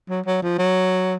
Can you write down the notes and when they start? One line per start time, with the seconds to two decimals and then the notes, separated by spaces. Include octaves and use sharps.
0.09 F#3
0.26 F#3
0.42 F3
0.58 F#3